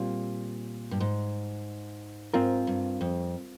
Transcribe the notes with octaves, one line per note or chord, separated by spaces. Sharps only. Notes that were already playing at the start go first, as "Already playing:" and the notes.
Already playing: A#2 G3 C4 F4
G2
G#2
G#2 C4 F4 A#4
G2
F2